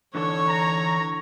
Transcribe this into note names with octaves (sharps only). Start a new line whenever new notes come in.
D3 E3 A4 C#5 C#6
A#5